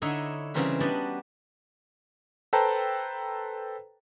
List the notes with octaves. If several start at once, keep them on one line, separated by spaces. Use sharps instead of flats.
D3 D#4 E4 C#5 D#5 E5
C#3 E3 G3 C4 A#4 B4
G3 B3 D4 F#4 D5 D#5
A4 B4 C5 G5 A5 A#5